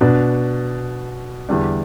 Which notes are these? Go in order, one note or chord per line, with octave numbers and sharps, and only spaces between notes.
B2 B3 D4
E2 D3 G3 D4